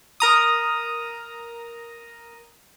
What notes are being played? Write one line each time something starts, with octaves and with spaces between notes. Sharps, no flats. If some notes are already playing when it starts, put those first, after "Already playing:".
A#4 A#5 D#6